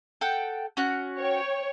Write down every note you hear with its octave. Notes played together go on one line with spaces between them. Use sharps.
A4 F#5 G5
C#4 F#4 F#6
C#5 G5